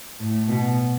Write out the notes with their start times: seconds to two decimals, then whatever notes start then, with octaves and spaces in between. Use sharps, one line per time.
0.20 A2
0.48 B2